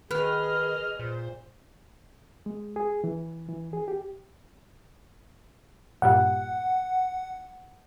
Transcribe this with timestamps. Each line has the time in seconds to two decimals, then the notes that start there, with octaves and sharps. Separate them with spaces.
0.11 D#3 G#4 B4 D#5 F6
0.99 A#2 C5
2.46 G#3
2.76 G#4
3.04 E3
3.49 E3
3.73 G#4
3.88 G4
6.02 G2 A#2 G3 F#5